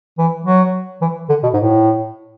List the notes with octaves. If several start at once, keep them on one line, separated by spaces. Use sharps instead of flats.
E3
F#3
E3
D3
B2
G#2
A2